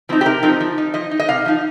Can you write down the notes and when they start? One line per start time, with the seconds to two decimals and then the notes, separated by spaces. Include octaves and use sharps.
0.09 F3 C4 D#4
0.21 G4
0.25 C3 A#4
0.43 F3 C4 D#4
0.61 F3
0.78 D#4
0.94 F3 D#5
1.11 D#4
1.20 D#5
1.28 C3 F5
1.46 F3 D#4